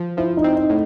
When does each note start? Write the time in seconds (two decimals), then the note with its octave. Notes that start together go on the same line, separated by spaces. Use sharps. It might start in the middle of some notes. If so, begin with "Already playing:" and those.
Already playing: F3
0.17 F3 E4
0.37 D#4
0.44 C4
0.57 D#4
0.70 A2